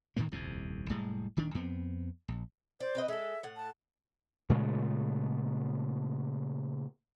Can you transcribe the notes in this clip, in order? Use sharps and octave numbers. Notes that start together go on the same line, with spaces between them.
A2 D#3 E3 A#3
D#1 C2 F2 C3
F1 A2 G3 G#3
D#1 D#3 D4
F2 B3 C4
A#1
C5 D5
C4 B4 D#5
G#3 A4 E5
A2 F#5
A5
A#2 C#3 G#3 A3